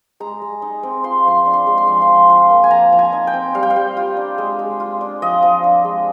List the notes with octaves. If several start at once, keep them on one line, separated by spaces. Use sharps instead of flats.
G#3 A#5
G#3
D#4
C4
F4 C6
F3 C6
D4
C6
G#3
C6
F3
C6
F3
F4
A#3
G#5
F3 A#5
F3
G#5
D#4
G5
C4
G3 F5
G5
F5
G3
F4
D4
G#3
G#3
F4
D4
F3 D#5
F3
D4
G#3